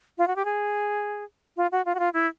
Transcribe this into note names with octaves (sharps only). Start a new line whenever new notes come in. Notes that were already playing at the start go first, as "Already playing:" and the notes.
F4
F#4
G4
G#4
F4
F#4
F4
F#4
F4
E4